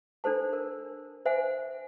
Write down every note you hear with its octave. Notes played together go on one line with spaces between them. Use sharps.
D4 A4 C5 A5
A#4
C5 E5 F#5 G#5